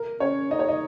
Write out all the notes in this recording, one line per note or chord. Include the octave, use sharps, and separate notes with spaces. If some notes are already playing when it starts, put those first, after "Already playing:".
Already playing: A#4
C#4 C#5
D#4 D#5
C#5
D#5